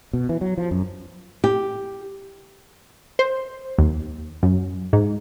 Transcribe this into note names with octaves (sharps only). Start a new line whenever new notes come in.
B2
E3
F#3
F3
F#2
G4
C5
D#2
F#2
G#2